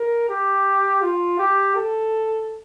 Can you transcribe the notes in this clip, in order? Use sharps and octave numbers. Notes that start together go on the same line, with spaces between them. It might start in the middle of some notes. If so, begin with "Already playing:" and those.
Already playing: A#4
G4
F4
G4
A4